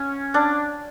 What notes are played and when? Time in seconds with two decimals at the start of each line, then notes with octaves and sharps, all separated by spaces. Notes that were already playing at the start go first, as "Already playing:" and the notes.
Already playing: C#4
0.34 D4